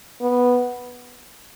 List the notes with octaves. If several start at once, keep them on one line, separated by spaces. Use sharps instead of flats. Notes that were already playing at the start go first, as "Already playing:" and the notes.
B3